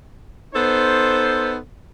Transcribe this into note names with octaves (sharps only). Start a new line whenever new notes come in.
B3 D#4 A4 C5